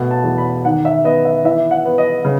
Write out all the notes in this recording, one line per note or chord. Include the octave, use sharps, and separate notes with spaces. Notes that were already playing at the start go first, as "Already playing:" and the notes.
Already playing: B2 A3
A5
E2
B5
D#3 F#5
E5
B3 D#5
E5
E3 E5
F#5
B3
D#5
C#3